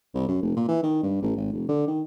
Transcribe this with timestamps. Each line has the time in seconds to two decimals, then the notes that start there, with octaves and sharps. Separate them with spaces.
0.14 C2
0.29 F#2
0.43 F1
0.57 A#2
0.68 E3
0.83 D#3
1.03 G2
1.22 A1
1.36 G#1
1.53 F1
1.69 D3
1.88 D#3